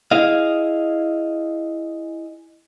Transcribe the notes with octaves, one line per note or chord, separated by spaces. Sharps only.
E4 G#4 D#5 F5